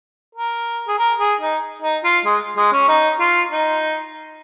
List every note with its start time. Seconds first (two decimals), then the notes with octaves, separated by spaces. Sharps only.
0.35 A#4
0.88 G#4
0.99 A#4
1.20 G#4
1.41 D#4
1.82 D#4
2.04 F4
2.25 G#3
2.57 G#3
2.73 C#4
2.88 D#4
3.20 F4
3.52 D#4